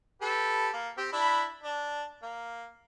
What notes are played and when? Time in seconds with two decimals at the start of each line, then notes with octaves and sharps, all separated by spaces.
0.22 G4 A4 B4
0.73 A#3
0.98 C4 G4
1.12 D4 E4 B5
1.64 D4
2.22 A#3